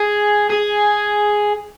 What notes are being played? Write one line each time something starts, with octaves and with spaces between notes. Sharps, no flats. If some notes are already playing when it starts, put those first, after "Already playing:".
Already playing: G#4
G#4